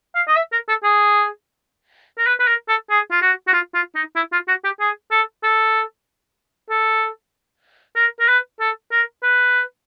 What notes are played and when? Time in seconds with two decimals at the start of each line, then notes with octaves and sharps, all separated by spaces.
0.15 F5
0.28 D#5
0.36 E5
0.52 A#4
0.68 A4
0.84 G#4
2.18 A#4
2.27 B4
2.40 B4
2.47 A#4
2.69 A4
2.90 G#4
3.11 F4
3.22 F#4
3.48 F#4
3.53 F4
3.74 F4
3.95 D#4
4.16 E4
4.32 F4
4.48 F#4
4.64 G4
4.80 G#4
5.11 A4
5.43 A4
6.70 A4
7.96 A#4
8.20 A#4
8.28 B4
8.60 A4
8.92 A#4
9.23 B4